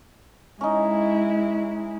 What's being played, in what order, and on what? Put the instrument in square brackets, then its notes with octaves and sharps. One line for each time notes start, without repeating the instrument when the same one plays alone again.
[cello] G#3 E4 [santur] C#4 D#4